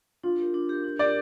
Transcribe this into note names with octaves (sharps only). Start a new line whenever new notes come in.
D4 F4
G4 A#4
D4
G4 A#4
D4
G4 A#4 D5